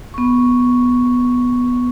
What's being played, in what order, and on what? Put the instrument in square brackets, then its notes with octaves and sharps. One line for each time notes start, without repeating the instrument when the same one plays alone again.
[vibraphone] B3 C#6